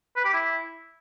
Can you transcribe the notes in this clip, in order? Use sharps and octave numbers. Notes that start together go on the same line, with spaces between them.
B4
G4
E4